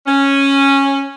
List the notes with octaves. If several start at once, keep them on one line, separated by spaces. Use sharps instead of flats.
C#4